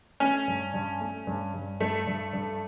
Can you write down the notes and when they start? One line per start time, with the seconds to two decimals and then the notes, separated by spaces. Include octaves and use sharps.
0.20 A3 C#4
0.48 G2
0.74 G2
1.00 A3
1.27 G2
1.54 G2
1.80 G2 A3
2.07 G2
2.33 G2